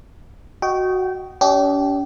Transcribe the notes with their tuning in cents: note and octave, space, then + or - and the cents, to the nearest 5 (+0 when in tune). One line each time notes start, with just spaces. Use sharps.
F#4 +0 D#5 +0 G5 -25
C#4 +45 G4 -25 D#5 +0